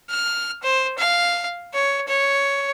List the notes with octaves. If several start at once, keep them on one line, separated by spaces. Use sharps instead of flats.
F6
C5
F5
C#5
C#5